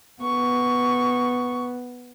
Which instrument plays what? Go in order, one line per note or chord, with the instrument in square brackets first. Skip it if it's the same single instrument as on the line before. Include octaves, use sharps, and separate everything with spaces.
[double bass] B3 [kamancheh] C#6